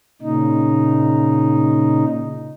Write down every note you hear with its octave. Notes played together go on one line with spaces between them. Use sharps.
A#2 C#3 D#4